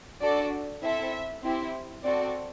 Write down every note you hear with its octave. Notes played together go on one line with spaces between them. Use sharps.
D4 F#4 A4 D5
C4 E4 A4 E5
C4 E4 G4
C4 F#4 A4 D5